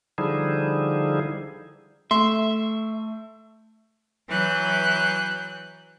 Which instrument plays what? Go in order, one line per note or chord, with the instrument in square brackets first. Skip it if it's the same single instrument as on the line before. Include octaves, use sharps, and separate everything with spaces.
[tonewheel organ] D3 F3 G3 D#4 E4 G#4
[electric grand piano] A3 [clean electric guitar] E5 [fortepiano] C6
[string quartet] E3 F#3 B4 F#6 G6